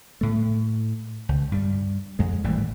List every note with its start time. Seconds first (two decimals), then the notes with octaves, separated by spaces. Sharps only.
0.21 A2 A3
1.29 C#2
1.52 G2 G3
2.19 F2 G#3
2.44 G#1 A2 E3 G3